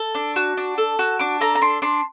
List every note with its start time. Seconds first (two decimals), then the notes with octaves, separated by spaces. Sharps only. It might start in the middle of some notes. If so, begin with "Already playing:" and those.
Already playing: A4
0.15 D4
0.36 F#4
0.57 D4
0.78 A4
0.99 F#4
1.19 D4 D6
1.41 A4 A#5
1.55 A#5
1.62 D4 C6
1.82 D4 C6